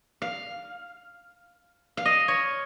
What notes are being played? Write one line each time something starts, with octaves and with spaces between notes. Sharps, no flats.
F5
F5
D#5
C#5